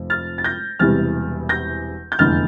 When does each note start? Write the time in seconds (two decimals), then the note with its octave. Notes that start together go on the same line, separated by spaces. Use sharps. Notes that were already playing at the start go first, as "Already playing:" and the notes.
Already playing: F1 F2
0.10 F6 A6
0.38 A6
0.44 G6 A#6
0.79 E1 E2 C3 G3 F6 A6
1.49 G6 A#6
2.12 G6
2.19 F1 E2 D3 F6 A6